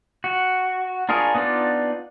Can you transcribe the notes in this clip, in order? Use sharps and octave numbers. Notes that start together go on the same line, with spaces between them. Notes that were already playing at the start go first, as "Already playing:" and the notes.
F#4
D4 F4 G#4 A#4 C#5
B3 D4 D#4 F4 D5